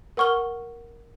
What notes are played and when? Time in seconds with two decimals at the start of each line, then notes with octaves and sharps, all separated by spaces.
0.17 A#4 F#5 C#6 F6 G7